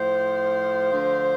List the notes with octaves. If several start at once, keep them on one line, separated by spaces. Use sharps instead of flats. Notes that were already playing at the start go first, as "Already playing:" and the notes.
Already playing: A2 F3 C5
D2 D3 F3